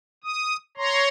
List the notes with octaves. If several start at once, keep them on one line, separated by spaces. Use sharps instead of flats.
D#6
C#5 A#5 C6